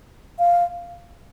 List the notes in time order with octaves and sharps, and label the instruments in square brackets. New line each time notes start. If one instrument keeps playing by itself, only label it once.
[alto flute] F5